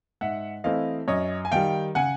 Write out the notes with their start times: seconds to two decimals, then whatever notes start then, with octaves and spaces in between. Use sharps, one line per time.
0.21 G#2 E5 F#5
0.64 E3 A3 C4 E4 D#5 F5
1.08 F#2 C#5 D#5
1.45 G#5
1.51 D#3 G3 F5 G5
1.95 C#3 F#5 G#5